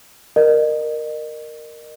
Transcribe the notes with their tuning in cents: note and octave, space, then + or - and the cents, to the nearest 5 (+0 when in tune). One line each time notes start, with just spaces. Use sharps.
A#4 +0 D#5 -35